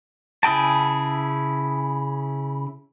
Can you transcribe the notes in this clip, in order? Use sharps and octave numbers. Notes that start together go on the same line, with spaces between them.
C#3 E4 G#4 G5 A5